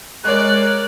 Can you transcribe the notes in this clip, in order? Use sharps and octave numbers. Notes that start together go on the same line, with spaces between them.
G#3 A#4 C#5 D5 F#6